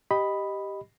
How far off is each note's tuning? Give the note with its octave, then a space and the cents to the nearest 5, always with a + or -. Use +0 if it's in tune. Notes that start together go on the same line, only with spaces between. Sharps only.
G4 +0 D#5 +0 B5 +0